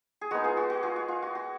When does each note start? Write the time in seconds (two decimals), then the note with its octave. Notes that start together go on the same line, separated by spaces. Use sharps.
0.21 G#4
0.31 G#3 B3 D#4 F#4 A#4
0.44 F4 G#4
0.57 F#4
0.70 F#4
0.83 F4 G#4
0.96 F#4
1.08 F4
1.22 F#4
1.35 F#4